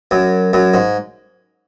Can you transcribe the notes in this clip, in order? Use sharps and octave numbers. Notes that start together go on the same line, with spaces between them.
F#2
F#2
G#2